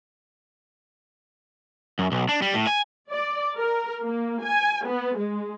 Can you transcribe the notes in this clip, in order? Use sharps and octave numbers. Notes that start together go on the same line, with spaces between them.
F#2
B1
D4
G3
A2
G#5
D5
A#4
A#3
G#5
B3
G#3